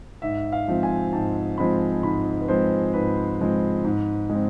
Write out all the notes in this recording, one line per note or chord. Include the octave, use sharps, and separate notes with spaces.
G#2 E5
F5
F3 G#3 C4
G#5
G#2 A5
F3 G#3 C4 B5
G#2 B5
B4
F3 G#3 C4 C5
G#2 B4
F3 G#3 C4
G#2
G#3 C4